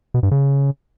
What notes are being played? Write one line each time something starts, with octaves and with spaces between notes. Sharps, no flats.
B2
G2
C#3